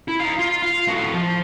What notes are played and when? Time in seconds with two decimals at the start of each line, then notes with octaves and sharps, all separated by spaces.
0.08 E4
0.20 D#4 F5
0.39 F4
0.62 F5
0.87 A2 F#4
1.13 F3